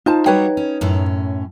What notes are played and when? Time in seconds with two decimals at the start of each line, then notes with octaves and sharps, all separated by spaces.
0.06 D#4 F4 C5 A5
0.26 F#3 G3 F#4 B4 C#5 G5
0.57 C#4
0.81 F#2 A2 C#4